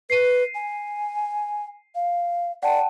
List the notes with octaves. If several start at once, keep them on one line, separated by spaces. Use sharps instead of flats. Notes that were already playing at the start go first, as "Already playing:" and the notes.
B4 C7 D#7
G#5
F5
D5 F#5 G5 A5